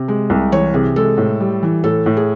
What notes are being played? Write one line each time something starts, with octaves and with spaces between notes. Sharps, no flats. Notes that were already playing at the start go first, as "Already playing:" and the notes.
Already playing: C3
G#3
C2
E3 C#5
C3 G#4
G#3 A4
A2
G3
E3
A2 A4
A2
G#4